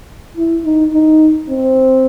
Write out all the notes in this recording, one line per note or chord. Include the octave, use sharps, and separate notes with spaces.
E4
D#4
D#4
C4